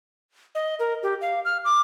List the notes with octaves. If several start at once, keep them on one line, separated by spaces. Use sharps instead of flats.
D#5
A#4
G4
F5
F6
D6